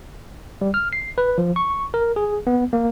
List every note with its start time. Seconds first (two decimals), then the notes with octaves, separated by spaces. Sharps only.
0.61 G3
0.74 F6
0.93 C7
1.18 B4
1.38 F3
1.56 C#6
1.94 A#4
2.16 G#4
2.47 B3
2.73 A#3